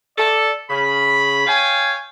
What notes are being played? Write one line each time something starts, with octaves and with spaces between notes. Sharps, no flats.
A4 D5
C#3 B5
C#5 F5 G5 G#5